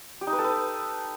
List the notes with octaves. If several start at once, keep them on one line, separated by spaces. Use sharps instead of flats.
G4
D#4
B4
A4
B4